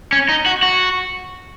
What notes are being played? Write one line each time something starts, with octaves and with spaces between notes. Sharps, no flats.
C#4
D#4
F#4
F#4